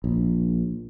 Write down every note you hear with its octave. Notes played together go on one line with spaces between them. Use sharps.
A#1